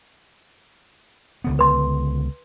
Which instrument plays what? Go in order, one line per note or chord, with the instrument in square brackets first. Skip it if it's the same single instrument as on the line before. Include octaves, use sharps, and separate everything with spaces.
[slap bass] C#2 D3 B3
[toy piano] B4 C6